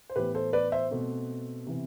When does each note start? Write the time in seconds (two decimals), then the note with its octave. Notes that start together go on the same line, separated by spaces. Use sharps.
0.10 C5
0.16 A2 E3 B3 G4 B4
0.35 A4 C5
0.53 B4 D5
0.72 C5 E5
0.91 B2 A3 C4
1.66 C3 E3 B3